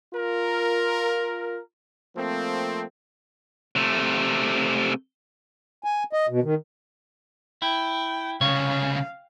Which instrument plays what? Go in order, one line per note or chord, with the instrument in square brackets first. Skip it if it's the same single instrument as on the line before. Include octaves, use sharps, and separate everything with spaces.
[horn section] F4 A#4
F3 A3 A#3 C4
[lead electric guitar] C3 A3
[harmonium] G#5
D#5
B2
D#3
[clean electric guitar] E4 [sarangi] G5
[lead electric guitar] C2 C#3 [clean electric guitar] C#5 [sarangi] F5